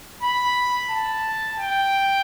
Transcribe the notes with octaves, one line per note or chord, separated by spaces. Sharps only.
B5
A5
G5